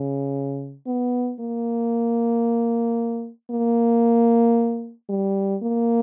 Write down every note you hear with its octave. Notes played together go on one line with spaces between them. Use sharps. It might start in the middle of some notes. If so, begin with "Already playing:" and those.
Already playing: C#3
B3
A#3
A#3
G3
A#3